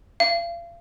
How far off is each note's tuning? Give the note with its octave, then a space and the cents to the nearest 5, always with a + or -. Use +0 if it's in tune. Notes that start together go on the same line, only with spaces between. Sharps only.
F5 -35